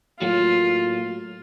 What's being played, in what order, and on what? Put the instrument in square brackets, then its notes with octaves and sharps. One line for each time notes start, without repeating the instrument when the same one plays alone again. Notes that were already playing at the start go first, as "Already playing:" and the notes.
[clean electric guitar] A2 F#3 A#3 [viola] F4